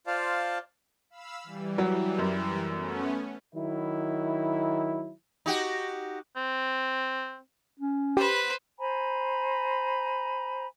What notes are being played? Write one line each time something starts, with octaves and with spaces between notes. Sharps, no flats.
F4 C5 D5 F5 A5
F5 B5 E6
E3 G3
F#3
F#2
A3 B3 C#4
D#3 F#3 E4
D#4 F#4 G4
C4
C#4
G4 B4 C5
C5 G#5 A#5 B5